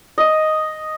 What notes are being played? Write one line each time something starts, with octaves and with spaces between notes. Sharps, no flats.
D#5